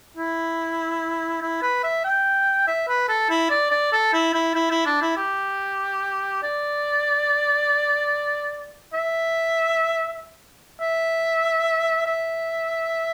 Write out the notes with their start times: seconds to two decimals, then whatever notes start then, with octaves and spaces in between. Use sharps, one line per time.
0.17 E4
1.42 E4
1.62 B4
1.83 E5
2.04 G5
2.67 E5
2.88 B4
3.08 A4
3.29 E4
3.50 D5
3.71 D5
3.93 A4
4.13 E4
4.33 E4
4.55 E4
4.70 E4
4.86 D4
5.01 E4
5.17 G4
6.43 D5
8.94 E5
10.81 E5
12.06 E5